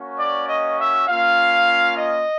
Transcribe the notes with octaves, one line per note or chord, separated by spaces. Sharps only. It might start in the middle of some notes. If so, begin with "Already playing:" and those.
Already playing: A#3 C#4 F#4
D5
D#5
E5
A#3 C#4 F4 F5
D#5